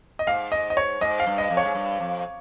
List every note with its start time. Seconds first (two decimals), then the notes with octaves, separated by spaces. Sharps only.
0.19 D#5
0.27 G#2 F5
0.52 D#5
0.70 D#5
0.77 C#5
1.01 G#2 D#5
1.20 F5
1.26 G2
1.38 D#5
1.50 F2
1.57 C#5
1.65 G#2
1.75 G2
2.00 F2